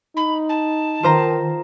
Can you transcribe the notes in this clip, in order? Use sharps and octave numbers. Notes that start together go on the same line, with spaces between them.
D#4 B5
A5
D#3 F4 C5 A#5